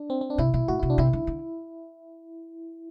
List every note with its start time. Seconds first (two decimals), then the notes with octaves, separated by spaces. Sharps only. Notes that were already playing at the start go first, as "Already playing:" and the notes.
Already playing: D4
0.10 C4
0.21 C4
0.30 D4
0.38 C3 E4
0.54 B2 E4
0.68 A2 F#4
0.79 C3 E4
0.90 D4
0.98 C3 E4
1.13 D3
1.27 D3